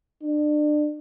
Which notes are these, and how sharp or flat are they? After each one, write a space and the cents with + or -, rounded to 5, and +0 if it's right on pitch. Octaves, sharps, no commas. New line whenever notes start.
D4 +30